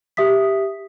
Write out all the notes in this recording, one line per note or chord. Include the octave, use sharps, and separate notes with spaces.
G4 E5 D#6 B6